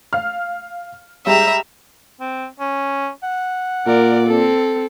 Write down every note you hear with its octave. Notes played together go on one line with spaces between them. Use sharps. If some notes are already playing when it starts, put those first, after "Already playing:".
F5 F6
G3 G#3 G4 E5 A#5
C4
C#4
F#5
A#2 A#4 D5
C4 A4